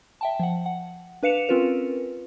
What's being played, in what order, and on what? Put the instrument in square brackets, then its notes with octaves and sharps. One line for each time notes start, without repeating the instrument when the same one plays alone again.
[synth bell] E5 G5 A5
F3 F#5
F#5
D4 B4 F5 C#7 E7 F7
C4 C#4 F4 A#4 B4